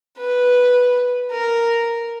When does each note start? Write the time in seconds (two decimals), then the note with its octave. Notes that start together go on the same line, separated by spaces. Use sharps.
0.18 B4
1.31 A#4